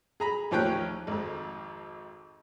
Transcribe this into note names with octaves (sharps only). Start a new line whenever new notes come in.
G#4 A#5 B5
A1 D#2 F3 C#5 G5 F#6
G#1 F2